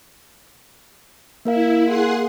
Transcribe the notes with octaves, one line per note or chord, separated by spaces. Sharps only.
A#3 E4 A#4 F5
G#4 F#5 C6